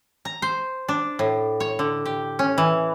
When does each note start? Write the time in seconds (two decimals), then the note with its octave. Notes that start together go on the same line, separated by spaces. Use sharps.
0.25 A#5
0.42 C5
0.89 D4
1.19 A2
1.60 C#5
1.79 D3
2.06 G4
2.39 C#4
2.58 E3